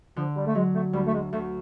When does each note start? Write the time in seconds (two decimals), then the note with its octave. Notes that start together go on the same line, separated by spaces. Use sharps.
0.16 D3 F3
0.36 G3
0.46 A3
0.55 F#3 G#3
0.74 A3
0.93 D2 G3
1.07 A3
1.13 G#3
1.32 D2 A3